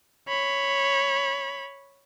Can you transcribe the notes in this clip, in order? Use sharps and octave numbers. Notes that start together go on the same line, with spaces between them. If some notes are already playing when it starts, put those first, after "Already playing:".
C#5 B5